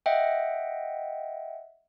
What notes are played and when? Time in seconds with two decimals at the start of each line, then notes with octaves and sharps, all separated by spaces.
0.06 D#5 E5 F#5 G5